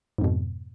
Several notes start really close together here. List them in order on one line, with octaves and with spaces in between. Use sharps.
G#2 F2 B2